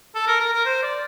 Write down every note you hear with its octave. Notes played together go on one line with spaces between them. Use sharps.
A4
A#4
A#4
A#4
C5
D5